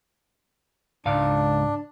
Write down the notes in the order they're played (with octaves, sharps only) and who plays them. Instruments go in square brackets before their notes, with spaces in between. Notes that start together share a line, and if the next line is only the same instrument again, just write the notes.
[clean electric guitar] C#2 G#2 F5 [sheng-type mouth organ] D4